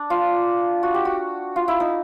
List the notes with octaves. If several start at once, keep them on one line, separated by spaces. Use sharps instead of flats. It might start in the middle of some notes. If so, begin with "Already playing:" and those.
Already playing: D4
F4
F#4
G4
F#4
F4
E4
D#4